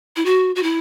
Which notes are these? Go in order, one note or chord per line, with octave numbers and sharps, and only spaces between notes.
E4
F#4
F#4
E4